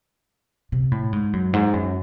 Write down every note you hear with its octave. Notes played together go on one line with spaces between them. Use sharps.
C3
A2
G#2
F#2
G#2
F#2